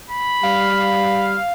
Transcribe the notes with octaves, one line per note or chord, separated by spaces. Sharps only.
B5
G3 F5